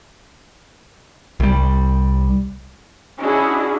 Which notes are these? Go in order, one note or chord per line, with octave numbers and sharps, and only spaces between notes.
C2 G3
C#4 D4 E4 F#4 G#4 D#5